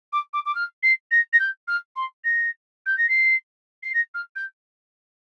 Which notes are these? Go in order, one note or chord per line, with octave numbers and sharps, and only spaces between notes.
D6
D6
D6
F6
C7
A#6
A#6
G6
F6
C6
A#6
G6
A#6
C7
C7
A#6
F6
G6